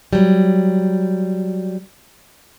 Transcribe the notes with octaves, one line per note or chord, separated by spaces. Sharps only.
F#3 G3